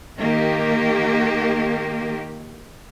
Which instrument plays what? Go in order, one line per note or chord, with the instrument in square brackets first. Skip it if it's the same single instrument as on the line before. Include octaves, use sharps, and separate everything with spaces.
[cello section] D#3 A#3 G4